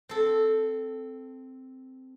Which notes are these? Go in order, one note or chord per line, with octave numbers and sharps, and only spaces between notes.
C4 A4